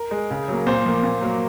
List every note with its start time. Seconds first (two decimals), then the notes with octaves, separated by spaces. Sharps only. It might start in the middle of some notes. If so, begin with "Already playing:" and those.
Already playing: A#4
0.11 G#3
0.31 C#3
0.48 F#3 A#3
0.66 A#2 C5
0.85 F3 A#3
1.03 A#2
1.21 F#3 A#3